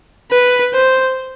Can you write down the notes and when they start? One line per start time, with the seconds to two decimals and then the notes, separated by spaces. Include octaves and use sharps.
0.31 B4
0.73 C5